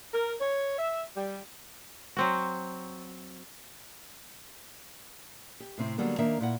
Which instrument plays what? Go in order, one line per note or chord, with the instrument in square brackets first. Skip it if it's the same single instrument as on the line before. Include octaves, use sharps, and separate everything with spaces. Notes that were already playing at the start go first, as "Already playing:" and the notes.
[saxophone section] A#4
C#5
E5
G3
[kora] F#3 C4 F#4
[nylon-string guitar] G4
A2 C3 C4 E4
D3 F#3 G3 A#3 B3
D#3 A#3 D4 E5
A#2 E4 F#5